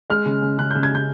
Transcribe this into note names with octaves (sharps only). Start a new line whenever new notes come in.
G#3 F6
C#3
C#3
C#3 F#6
G6
C#3
G#6
C#3 G6